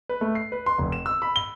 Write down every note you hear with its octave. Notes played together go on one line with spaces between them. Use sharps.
B4
A3
C7
B4
C6
F1
E7
E6
B5
G7